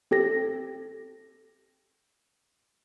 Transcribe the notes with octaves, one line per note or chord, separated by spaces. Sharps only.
C4 G4 A4 A#6